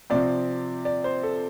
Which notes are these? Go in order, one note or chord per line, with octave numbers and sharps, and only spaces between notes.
C3 F3 C4 D5
D5
C5
A4